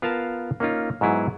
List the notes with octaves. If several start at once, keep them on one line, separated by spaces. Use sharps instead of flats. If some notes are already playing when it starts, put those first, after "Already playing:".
B3 F4 A#4 F5 A5
A#3 C#4 D#4 F4
G#2 F#3 B3 E4 G#4